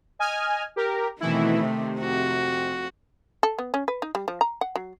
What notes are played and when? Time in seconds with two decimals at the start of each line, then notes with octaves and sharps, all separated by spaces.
0.19 D#5 G#5 F6
0.76 G4 A#4
1.21 B2 D#3 E3 A3 C4 E4
1.61 C3
1.97 F2 F#4
3.43 A4
3.59 B3
3.74 C#4
3.88 B4
4.02 D#4
4.15 G3
4.28 F3
4.41 A#5
4.61 F#5
4.76 F#3